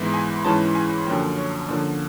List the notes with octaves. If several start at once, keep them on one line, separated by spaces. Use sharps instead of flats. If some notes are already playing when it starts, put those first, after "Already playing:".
Already playing: G#2 E3 G#3 B3 E4
G#5
G#2 E3 G#3 C#4 E4 A5
G#5
F#2 D3 F3 A#3 C#4 G5
C#5
D3 F3 A#3 C#4 D5